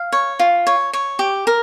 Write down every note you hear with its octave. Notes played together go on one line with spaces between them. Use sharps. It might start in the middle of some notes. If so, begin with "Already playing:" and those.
Already playing: F5
C#5
F4
C#5
C#5
G4
A#4